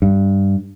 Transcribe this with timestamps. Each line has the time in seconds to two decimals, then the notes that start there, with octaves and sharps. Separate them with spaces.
0.02 G2